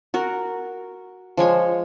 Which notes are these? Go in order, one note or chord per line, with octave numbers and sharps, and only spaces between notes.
F#4 A#4
F3 G#3 C#5 G#5